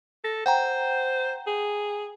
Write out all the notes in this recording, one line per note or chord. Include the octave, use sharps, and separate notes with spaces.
A4 A#6
C5 F#5 G5 A#5
G#4